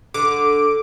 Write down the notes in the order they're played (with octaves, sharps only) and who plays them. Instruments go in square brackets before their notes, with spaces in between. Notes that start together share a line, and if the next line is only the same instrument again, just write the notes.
[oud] D3 [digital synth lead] D6